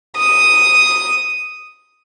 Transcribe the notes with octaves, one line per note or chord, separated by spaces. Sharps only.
D#6